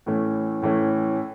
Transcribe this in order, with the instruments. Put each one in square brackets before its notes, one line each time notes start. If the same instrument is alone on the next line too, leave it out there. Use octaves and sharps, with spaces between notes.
[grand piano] A2 E3 A3 C#4
A2 E3 A3 C#4